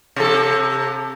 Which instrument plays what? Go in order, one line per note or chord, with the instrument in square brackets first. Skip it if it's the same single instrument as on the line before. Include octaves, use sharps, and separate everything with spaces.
[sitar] C3 A4